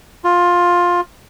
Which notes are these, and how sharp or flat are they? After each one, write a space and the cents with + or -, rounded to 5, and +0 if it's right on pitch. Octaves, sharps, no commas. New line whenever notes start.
F4 +15